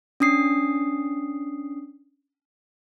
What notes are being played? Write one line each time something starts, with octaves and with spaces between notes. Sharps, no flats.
C#4 D4 D#6 C7